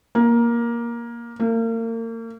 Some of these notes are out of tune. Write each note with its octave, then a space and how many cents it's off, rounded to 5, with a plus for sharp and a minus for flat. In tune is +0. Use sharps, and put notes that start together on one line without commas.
A#3 +10
A#3 -40